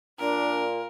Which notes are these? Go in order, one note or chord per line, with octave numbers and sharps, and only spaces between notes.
A#2 D4 A#4